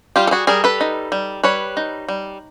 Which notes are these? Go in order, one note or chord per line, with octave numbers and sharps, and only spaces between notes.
G3 F4 G4
A4
F#4 G#4
G3 G#4 A#4
A4 B4
D#4
G3
G3 B4 C#5
D#4
G3